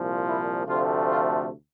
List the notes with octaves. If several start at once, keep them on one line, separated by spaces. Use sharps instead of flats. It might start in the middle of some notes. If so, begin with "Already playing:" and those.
Already playing: C2 A#2 F3
E4
D2 C3 F3 A3 F4
F4